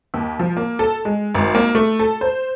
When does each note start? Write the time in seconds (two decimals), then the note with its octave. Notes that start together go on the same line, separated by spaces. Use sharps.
0.14 D#2
0.39 F3
0.57 A#3
0.79 A4
1.05 G#3
1.35 G#1
1.55 A#3
1.75 A3
1.99 A4
2.21 C5